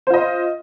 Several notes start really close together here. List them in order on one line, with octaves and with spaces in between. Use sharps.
C5 F4 D#5